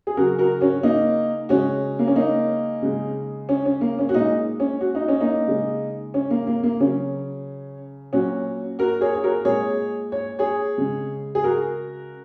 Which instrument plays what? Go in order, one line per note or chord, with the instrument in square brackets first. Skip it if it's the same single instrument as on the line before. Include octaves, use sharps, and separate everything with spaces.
[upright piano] G#4
C#3 F#3 F#4 A#4
F#4 A#4
C#4 F#4
A#3 D#4
C#3 G#3 C#4 F#4
A#3
C#4
A#3 D#4
C#3 G#3
C#4
C#4
A#3
C#4
F#4
A#2 G#3 A#3 D#4
C#4
F#4
D#4
C#4
A#3 D#4
C#3 G#3
C#4
A#3
A#3
A#3
C#3 F#3 C#4
A#2 F#3 C#4 F#4
F#4 A#4
G#4 C#5
C#5
F#4 A#4
A#2 G#3 G#4 C#5
C#5
G#4 C#5
C#3 G#3
G#4
F#4 A#4